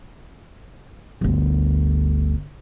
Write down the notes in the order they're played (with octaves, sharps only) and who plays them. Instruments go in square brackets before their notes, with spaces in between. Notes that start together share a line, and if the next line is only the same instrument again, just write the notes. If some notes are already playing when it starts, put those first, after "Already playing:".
[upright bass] G1 D2